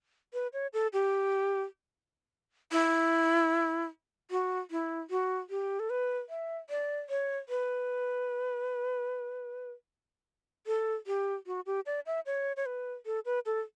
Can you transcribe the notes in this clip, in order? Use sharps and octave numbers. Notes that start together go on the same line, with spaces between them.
B4
C#5
A4
G4
E4
F#4
E4
F#4
G4
A4
B4
E5
D5
C#5
B4
A4
G4
F#4
G4
D5
E5
C#5
C#5
B4
A4
B4
A4